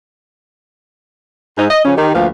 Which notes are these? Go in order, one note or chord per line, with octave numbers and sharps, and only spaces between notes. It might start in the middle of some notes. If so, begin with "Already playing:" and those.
G#2 D#4
D#5
C#3 F3 C#4
D#3 G4
D2 F3 A#3 B4 F5